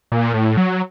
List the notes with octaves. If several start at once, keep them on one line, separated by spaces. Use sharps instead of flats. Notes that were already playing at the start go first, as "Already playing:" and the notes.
A#2
A2
F#3